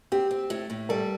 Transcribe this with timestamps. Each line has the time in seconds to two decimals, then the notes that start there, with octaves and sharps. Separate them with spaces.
0.12 C4 G4
0.31 C4
0.50 A2
0.70 A2
0.89 G3 A4